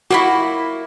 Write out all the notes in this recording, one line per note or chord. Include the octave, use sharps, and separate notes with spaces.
A#3 D4 E4 F#4